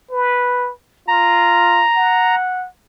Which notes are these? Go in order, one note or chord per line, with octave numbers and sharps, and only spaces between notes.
B4
F4 A#5
F#5